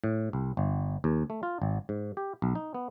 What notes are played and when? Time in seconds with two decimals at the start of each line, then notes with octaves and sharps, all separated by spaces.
0.04 A2
0.33 C2
0.57 G1
1.04 D#2
1.30 A3
1.43 F4
1.62 G#1
1.89 G#2
2.17 G4
2.42 B1
2.55 D#4
2.74 B3